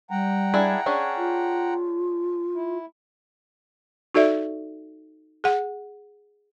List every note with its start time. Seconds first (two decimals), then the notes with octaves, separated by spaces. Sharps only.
0.11 G3 F#5 G5 A#5
0.54 D4 E4 G#4
0.86 C#4 D4 G#4
1.17 F4
2.54 E4
4.15 D#4 F#4 A4 D5 E5
5.44 G#4 F#5